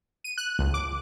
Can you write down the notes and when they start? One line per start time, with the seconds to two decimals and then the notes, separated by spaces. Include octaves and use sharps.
0.24 D#7
0.38 F#6
0.59 C#2
0.74 D6